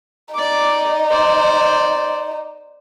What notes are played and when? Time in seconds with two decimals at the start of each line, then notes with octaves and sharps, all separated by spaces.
0.34 D#4 D5 D6
1.11 C5 D5